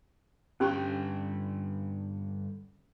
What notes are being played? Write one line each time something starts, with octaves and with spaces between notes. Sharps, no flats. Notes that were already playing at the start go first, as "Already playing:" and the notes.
G2 D3 C#4 G4 G5 C#6